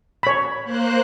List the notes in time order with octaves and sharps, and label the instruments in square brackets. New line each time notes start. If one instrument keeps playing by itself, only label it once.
[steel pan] C#5 B5
[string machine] A#3 C5 F#6